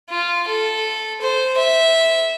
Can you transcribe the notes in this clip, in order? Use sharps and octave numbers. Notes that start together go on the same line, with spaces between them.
F4
A4
C5
E5